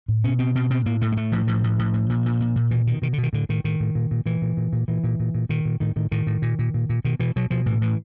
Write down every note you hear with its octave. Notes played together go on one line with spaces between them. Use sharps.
A2
B2 C#4
B2 C4
B2 C4
B2 C4
A2 A#3
A2 A3
G#3
A2 A3
A2 F3
A2 F3
A2
A2
A2
A#2
A#2
A#2
A#2
B2 E3
B2 D#3
B2 D#3
D3
B2
D#3
A2 D3
A2 D#3
A2 D#3
A2
A#2
A#2
A#2 E3
A#2
A#2
A#2
A#2 E3
A#2
A#2
A#2
A#2 D#3
A#2
A2 D#3
A2 D#3
A2 D#3
A2
A#2
A#2
A#2
A#2
B2 D#3
B2 E3
B2 F#3
B2 F3
A2 E3
A2 E3